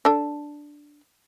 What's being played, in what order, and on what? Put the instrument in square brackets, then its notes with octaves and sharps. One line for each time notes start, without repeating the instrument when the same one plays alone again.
[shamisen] D4 A4